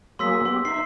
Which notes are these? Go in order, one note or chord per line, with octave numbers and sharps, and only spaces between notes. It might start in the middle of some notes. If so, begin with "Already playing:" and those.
F#3 A#3 G#4 C6 E6 B6
B3 G4 C6
D#4 E5 C7